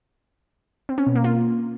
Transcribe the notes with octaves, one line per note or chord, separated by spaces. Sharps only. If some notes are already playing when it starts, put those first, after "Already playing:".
C4
C#4
B2
A#3
F4